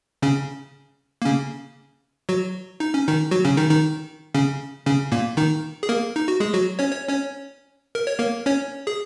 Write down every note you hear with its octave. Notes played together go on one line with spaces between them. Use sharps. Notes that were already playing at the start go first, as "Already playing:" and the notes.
C#3 C#4
A#3
C#3 C#4
F#3 F#4
D#4
C#4
D#3 D#4
F#3 F#4
C#3 C#4
D#3 D#4
D#3 D#4
C#3 C#4
C#3 C#4
A#2 A#3
D#3 D#4
G#4
A#3 A#4
D#4
F#4
G#3 G#4
F#3 F#4
C#4 C#5
C#5
C#4 C#5
A#4
C#5
A#3 A#4
C#4 C#5
G#4